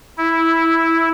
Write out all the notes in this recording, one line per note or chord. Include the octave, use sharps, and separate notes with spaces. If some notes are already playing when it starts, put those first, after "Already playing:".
E4